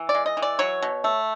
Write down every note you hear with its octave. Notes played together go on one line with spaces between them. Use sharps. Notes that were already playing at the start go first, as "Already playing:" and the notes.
Already playing: E3
D5
G#3
D#5
E3
D5
F#3 C#5
B2
A3